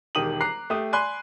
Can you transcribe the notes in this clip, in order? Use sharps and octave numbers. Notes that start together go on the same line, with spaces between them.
E1 D#3 G4 D#6 D#7 F#7
A#5 D6 F#6 C7
A3 G4 D#6
D5 G#5 B5 C6 F#6